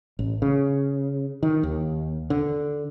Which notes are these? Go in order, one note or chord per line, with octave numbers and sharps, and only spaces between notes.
A1
C#3
D#3
D#2
D3